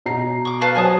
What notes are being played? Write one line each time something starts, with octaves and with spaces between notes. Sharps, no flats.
B2 A#5 C7
C#6 D6
B4 F5 A5
F#3 F#4 C5 C#5 G#5 A5 D#6